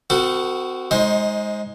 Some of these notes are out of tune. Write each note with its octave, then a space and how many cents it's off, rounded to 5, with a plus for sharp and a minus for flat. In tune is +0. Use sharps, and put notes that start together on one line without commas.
C4 -30 F#4 +0 A4 +45
G#3 +0 D#4 +25 C5 +20